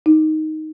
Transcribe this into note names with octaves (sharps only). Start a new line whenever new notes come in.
D#4